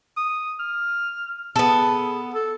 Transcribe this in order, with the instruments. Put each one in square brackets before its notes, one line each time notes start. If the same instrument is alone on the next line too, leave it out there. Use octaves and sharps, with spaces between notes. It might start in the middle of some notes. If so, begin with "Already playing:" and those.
[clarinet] D#6
F6
[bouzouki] B3 A4 [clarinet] G#4
[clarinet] A4